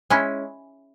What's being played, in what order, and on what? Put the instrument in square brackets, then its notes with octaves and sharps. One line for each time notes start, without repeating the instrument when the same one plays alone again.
[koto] G#3 C#4 E4